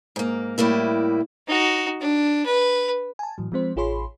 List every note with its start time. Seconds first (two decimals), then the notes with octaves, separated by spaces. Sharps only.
0.16 G#2 A#3
0.58 A2 G3 A#3 E4
1.47 D#4 F#4
2.01 D4
2.46 B4
3.19 G#5 A5
3.38 A2 E3 F#3
3.52 F3 G#3 C4 C5
3.76 A1 F4 G#4 C#5 B5 C6